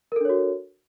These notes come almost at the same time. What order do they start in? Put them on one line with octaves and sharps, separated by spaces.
A#4 A4 D4 C#5 F#4